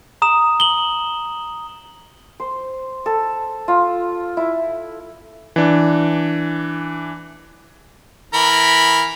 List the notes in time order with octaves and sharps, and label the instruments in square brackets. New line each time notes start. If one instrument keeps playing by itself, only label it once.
[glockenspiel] A#5 D#6 E7
F#7 G7
[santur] C5
A4
F4
E4
[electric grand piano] E3 D4
[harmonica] E3 A#4 B5